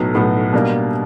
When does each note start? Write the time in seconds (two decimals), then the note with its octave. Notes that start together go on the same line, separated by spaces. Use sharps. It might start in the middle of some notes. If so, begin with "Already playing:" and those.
Already playing: B1 A2 F#3 B3
0.15 B1 A2 F#3 B3
0.53 B2 G3 A#3 D4